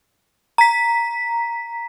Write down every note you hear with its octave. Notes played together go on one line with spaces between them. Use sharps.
A#5 B6